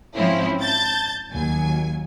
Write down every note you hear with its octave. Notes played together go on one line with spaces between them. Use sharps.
G#2 F3 C4 C#4 E4
A5 G6 A6
D#2 F#3 G#5